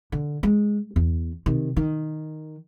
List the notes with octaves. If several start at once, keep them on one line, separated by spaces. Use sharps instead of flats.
D3
G#3
E2
C3 D#3
D#3